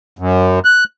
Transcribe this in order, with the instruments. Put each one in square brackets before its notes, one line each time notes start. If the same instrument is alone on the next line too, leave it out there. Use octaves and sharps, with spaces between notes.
[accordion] F#2
F#6